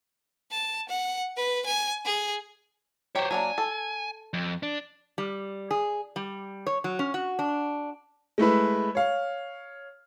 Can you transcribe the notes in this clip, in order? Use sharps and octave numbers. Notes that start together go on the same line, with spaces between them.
A5
F#5
B4
G#5
G#4
F#3 G4 C5 C#5
F#3 A#3 D4 G#5
A4
F2
D4
G3
G#4
G3
C#5
F#3
C#4
F#4
D4
G#3 A3 E4 B4
C#5 F5